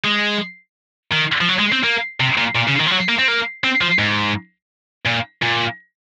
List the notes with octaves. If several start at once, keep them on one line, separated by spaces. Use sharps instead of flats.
G#3
D#3
F3
F#3
G#3
C4
A#3
C3
A#2
A#2
C#3
D#3
F3
F#3
A#3
C4
A#3
C4
F3
G#2
A#2
A#2